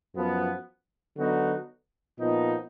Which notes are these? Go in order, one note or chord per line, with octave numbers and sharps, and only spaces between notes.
F#2 F3 B3
D3 F#3 B3 D#4 F#4
A#2 F3 B3 D#4